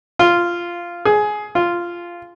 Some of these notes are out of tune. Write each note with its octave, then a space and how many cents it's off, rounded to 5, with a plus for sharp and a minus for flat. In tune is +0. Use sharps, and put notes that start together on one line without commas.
F4 -10
G#4 +15
F4 -10